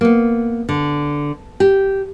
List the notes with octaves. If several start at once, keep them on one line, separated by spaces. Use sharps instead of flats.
A#3 B3
D3
G4